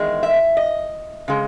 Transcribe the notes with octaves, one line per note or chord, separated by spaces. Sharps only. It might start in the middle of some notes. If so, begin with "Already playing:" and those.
Already playing: E2 D#3 G#3
E5
D#5
C#3 G#3